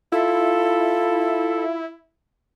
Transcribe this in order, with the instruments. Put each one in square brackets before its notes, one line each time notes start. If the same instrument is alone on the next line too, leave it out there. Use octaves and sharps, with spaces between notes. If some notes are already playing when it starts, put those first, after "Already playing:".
[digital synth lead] E4 [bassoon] F4 [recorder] A4